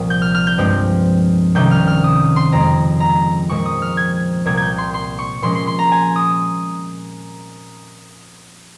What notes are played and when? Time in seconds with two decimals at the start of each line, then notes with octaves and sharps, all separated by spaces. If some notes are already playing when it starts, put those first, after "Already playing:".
Already playing: C2 A#2 F3
0.10 G6
0.22 F6
0.35 F6
0.47 G6
0.58 G2 F3 G#3 C4
1.55 C2 C3 D#3 G3 C#4 G6
1.71 F6
1.87 F6
2.04 D#6
2.36 C6
2.52 F2 C#3 G#3 C4 A#5
3.00 A#5
3.49 A#2 F3 G#3 C4 C#6
3.66 D#6
3.82 F6
3.97 G#6
4.45 C2 A#2 G3 A#3 G#6
4.57 G6 G#6
4.78 C6
4.94 C6
5.19 C#6
5.42 A#2 F3 G#3 C#4 C6
5.55 C6
5.67 C6
5.79 A#5
5.92 G#5
6.16 D#6